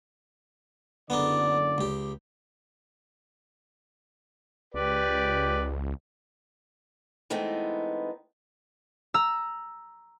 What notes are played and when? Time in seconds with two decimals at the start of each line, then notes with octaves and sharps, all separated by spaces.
1.10 F#1 D3 B3 D4 D#4 D5
1.78 C#2 G4
4.74 C#2 G4 B4 D5
7.30 E3 G#3 A3 B3 C4 D#4
9.14 A#5 E6